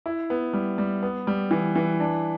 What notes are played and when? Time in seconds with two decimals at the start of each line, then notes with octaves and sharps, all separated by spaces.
0.06 E4
0.30 B3
0.53 G3
0.78 G3
1.03 B3
1.27 G3
1.51 E3
1.76 E3
2.00 D4